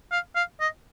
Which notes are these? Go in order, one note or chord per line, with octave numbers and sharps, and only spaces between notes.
F5
F5
D#5